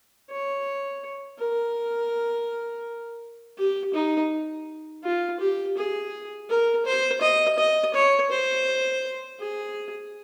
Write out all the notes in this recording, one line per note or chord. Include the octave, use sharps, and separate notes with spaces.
C#5
A#4
G4
D#4
F4
G4
G#4
A#4
C5
D#5
D#5
C#5
C5
G#4